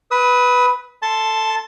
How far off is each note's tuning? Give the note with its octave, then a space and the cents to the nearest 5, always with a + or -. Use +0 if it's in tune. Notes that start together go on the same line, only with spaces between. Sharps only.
B4 +0 D#6 +40
A4 +15 A5 +0 C6 +0